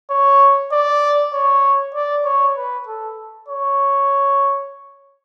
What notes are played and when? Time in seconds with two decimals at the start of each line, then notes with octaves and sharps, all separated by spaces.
0.10 C#5
0.72 D5
1.33 C#5
1.95 D5
2.25 C#5
2.57 B4
2.87 A4
3.48 C#5